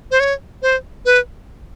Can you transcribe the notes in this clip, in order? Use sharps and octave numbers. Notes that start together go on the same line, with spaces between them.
C5
C#5
C5
B4